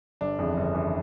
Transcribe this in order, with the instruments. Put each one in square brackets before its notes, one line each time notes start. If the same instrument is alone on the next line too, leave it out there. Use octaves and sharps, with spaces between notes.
[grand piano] G1 D4
F2 C#3 E3
G1
C#3 E3